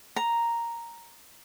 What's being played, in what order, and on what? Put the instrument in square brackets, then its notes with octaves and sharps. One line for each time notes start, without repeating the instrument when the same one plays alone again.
[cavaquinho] A#5